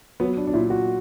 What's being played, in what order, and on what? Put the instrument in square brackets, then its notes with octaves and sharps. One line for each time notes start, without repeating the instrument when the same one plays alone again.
[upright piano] F#3 [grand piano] B3
[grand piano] D4
D4
[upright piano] A#2 [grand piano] E4
[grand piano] F#4